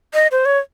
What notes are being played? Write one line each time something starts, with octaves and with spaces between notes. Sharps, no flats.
D#5
C5
C#5